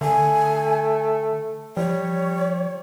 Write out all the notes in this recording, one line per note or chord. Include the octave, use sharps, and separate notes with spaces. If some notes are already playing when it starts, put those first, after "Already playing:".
D3 A3 G#5
F3 G3 C#5